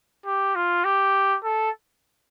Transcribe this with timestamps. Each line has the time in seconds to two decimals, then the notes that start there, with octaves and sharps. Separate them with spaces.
0.26 G4
0.55 F4
0.84 G4
1.44 A4